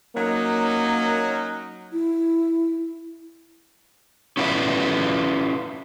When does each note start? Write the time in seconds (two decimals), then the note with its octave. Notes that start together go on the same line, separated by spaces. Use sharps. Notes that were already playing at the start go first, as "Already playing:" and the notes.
0.16 F#3 A#3 C#4 D#4
1.93 E4
4.37 C#4 E4 F4 B4 D5 E5